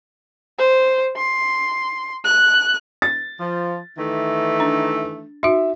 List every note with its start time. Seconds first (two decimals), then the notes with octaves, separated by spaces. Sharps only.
0.58 C5
1.16 C6
2.24 F#6
3.02 A6
3.40 F3
3.98 D#3 E3 A3
4.60 D4
5.43 D#4 F#4 E5